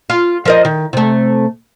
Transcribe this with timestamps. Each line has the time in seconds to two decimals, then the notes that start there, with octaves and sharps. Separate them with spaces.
0.10 F4
0.45 F3 A#4 D#5
0.65 D#3
0.93 C3 A3